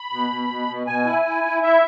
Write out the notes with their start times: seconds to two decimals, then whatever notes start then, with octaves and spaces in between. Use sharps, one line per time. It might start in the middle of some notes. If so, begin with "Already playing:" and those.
Already playing: B5
0.12 B2
0.30 B2
0.50 B2
0.68 B2
0.87 B2 G#5
1.06 E4
1.24 E4
1.44 E4
1.62 E4 E5